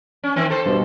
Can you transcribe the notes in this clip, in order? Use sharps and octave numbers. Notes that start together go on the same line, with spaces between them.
C#4
D#3 C4
A4 C5
G2 B2